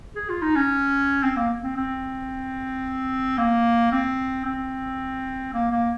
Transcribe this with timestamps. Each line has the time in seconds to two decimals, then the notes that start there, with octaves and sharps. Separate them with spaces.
0.16 G#4
0.29 F4
0.42 D#4
0.56 C#4
1.23 C4
1.37 A#3
1.63 C4
1.77 C4
3.38 A#3
3.92 C4
4.45 C4
5.53 A#3
5.71 A#3